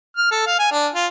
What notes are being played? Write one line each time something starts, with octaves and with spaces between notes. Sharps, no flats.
F6
A4
F5
G#5
D4
F4